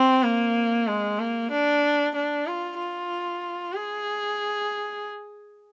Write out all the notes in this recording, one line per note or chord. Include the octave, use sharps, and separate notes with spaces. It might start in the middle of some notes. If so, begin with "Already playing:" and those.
Already playing: C4
A#3
G#3
A#3
D4
D4
F4
F4
G#4